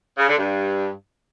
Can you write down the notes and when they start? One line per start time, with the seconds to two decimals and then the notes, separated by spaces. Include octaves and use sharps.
0.16 C#3
0.27 D3
0.38 G2